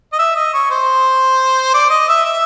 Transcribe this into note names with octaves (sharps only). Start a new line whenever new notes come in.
D#5
E5
D#5
C#5
C5
D5
D#5
E5
E5